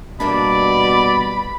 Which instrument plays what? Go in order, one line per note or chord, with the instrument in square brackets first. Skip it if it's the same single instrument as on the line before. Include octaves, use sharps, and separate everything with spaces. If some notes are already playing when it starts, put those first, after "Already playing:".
[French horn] B2 [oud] G3 A#3 D4 [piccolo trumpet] D5 [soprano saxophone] B5